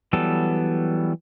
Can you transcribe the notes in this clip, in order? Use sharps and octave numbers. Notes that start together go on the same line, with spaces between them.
E3 F#3 G3 B3 A4